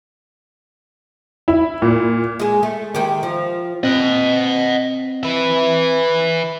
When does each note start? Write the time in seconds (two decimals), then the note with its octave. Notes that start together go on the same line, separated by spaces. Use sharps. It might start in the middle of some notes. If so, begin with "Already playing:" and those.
1.48 E4
1.82 A#2
2.40 G#3 G#4
2.63 A3
2.95 D#3 G#3 G4
3.23 F3
3.84 C4 D#5 F#5
5.23 B4 E5